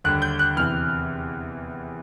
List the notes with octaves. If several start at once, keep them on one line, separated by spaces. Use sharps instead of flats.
D#2 D3 G3 F#6
G6
F#6
E2 C3 E3 F6